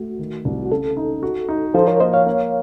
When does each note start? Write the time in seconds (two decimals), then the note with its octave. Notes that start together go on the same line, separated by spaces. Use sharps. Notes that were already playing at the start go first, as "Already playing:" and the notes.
Already playing: A3 F#4
0.19 D#3
0.45 C2
0.62 F#4
0.71 C#3 A4
0.97 D#4
1.23 F#4
1.49 D#4
1.74 F3 A4 C5
1.87 A#4 C#5
2.00 A#3 C5 D#5
2.14 C#5 F5
2.26 A#3